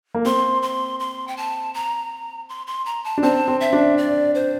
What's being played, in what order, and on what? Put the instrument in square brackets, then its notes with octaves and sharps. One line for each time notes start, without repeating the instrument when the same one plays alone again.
[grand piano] A#3
[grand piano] C4 [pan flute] C6
[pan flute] C6
C6
G5
A5
A#5
C6
C6
A#5
A5
[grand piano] D4
[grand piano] C4 [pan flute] A5
[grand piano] C4
[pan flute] E5
[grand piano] D4
[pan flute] D5
C5